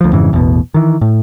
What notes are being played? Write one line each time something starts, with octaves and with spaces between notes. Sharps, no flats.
D2 F3
F2 G#2 C#3 E3
A1 E2 B2
D#3 E3
A2